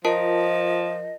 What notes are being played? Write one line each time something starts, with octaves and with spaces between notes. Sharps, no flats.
F3 F4 A#4 D#5 A5